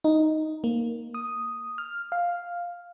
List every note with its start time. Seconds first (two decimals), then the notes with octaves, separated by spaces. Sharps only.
0.04 D#4
0.64 A#3
1.14 D#6
1.78 F6
2.12 F5